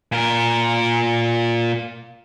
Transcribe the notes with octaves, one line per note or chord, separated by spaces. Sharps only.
A#2 A#4